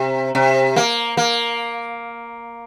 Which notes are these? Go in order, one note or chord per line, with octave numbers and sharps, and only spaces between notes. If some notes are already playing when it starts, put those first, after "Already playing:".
Already playing: C3
C3
A#3
A#3